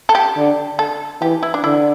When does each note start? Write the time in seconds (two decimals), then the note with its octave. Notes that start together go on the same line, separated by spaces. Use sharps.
0.09 A4
0.15 G4
0.36 D3
0.79 A4
1.21 E3 G4
1.43 E4
1.54 D4
1.64 D3 E4